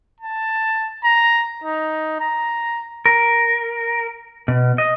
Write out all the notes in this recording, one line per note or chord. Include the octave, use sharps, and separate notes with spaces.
A5
A#5
D#4
A#5
A#4
B2
D#5